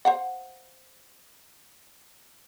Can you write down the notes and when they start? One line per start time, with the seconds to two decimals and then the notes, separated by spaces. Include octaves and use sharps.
0.05 C5 F5 F#5